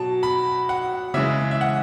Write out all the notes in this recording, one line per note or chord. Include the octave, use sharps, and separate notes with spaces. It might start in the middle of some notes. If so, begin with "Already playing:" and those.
Already playing: B2 F#3 A5
B5
F#5
C#3 E3 G#3 E5
E5
F#5